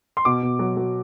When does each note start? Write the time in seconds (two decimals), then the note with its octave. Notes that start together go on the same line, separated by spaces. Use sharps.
0.17 C6
0.25 B2 D6
0.43 B2
0.59 F#3
0.77 F#3